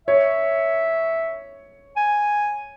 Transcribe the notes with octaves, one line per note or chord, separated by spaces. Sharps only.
C#5 E5
G#5